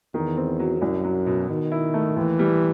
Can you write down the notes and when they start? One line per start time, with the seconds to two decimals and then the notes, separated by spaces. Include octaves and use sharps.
0.14 E2 D#3
0.37 C4
0.59 F#3
0.81 C2 F#2
1.04 F#3
1.26 B2
1.49 B2 D#3
1.72 E4
1.94 A3
2.16 D#2 E3
2.39 G3